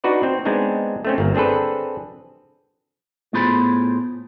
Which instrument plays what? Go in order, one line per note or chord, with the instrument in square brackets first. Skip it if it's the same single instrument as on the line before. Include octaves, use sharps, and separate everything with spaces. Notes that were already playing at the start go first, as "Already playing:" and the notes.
[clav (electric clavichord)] D4 D#4 F#4 B4 D5
C4
G#3 B3 C4 D4 D#4
A3 C4 C#4
G1 A#3
C4 D4 G#4 A4 B4
[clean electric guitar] A2 B3 F4 G#4 C5 B5